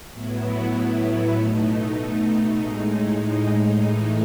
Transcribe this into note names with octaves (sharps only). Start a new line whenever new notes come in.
A2 F#3 B3 E4
B2 A3 D#4
A2 G#3 D#4
A2 E3 A3 D#4